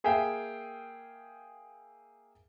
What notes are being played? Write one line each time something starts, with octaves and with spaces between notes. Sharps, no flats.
A#3 G#4 E5 F5 G5 G#5